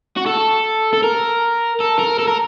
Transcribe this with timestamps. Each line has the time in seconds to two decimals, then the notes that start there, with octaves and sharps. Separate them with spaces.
0.17 F#4
0.26 A4
0.94 A4
1.03 A#4
1.80 A4
1.99 A#4
2.19 A4
2.28 A#4